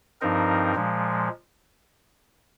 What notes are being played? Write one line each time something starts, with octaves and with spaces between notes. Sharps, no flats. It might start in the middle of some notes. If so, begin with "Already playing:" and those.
G2 F3 C4 D#4 A#4
A#2 F3 G#3